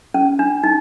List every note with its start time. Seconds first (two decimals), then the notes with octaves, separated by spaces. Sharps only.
0.14 C#4
0.39 D4
0.64 D#4